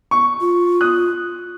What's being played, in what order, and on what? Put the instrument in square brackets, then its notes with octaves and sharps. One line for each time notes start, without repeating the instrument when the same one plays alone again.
[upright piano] C#6
[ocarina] F4
[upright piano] D#6 F#6